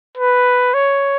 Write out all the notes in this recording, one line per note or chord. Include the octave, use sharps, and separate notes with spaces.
B4
C#5